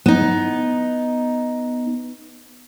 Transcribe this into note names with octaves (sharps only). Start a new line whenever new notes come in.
B3 D#4